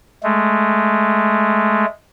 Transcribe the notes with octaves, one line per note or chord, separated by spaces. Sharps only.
G#3 A3